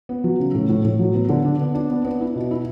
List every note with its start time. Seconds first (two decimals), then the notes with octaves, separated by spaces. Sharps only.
0.09 B3
0.24 F#3
0.40 C#3
0.54 A2
0.69 A2
0.85 A2
0.99 F#3
1.14 B3
1.29 D3
1.45 D4
1.60 B3
1.75 D4
1.90 B3
2.05 B3
2.21 E4
2.36 B2
2.51 E4